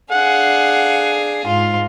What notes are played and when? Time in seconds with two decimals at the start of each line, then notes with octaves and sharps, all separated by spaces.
0.11 D4 G#4 F5 F#5
1.46 G#2 F4